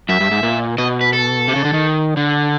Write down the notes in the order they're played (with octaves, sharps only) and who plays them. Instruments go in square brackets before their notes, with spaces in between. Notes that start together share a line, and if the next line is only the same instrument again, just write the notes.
[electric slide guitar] F#2 [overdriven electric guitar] E5
[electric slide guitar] G2
G#2
A#2
[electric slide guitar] B2 [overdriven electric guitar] D#5
[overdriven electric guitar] B4
A4
[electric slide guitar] C3
C#3
D3
D#3
D3